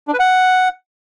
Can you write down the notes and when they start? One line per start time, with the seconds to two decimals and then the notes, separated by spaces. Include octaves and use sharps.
0.08 D4
0.13 B4
0.19 F#5